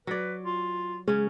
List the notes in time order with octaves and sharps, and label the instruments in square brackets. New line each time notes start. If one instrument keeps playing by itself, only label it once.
[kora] F#3 D5 [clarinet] B4
[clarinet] F4
[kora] C#3 C#4 [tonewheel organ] G#3